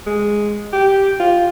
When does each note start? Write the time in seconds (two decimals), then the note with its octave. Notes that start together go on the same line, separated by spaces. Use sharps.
0.07 G#3
0.73 G4
1.20 F4